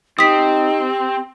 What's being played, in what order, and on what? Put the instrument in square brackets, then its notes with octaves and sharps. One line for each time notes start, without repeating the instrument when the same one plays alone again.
[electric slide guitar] C4 [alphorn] D#4 [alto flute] G4 [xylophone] D#6 B6